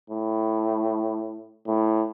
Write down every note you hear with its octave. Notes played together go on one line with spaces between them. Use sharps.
A2
A2